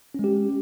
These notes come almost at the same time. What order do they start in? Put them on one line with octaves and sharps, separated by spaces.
C#4 G#3 G4